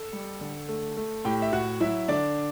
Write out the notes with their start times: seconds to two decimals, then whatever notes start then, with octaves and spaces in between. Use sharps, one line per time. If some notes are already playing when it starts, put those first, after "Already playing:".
Already playing: A4
0.13 G3
0.41 D3
0.69 A3
0.97 A3
1.25 A2 G4 G5
1.42 E5
1.53 A2 F#4 F#5
1.81 F#3 E4 E5
2.08 D3 D4 D5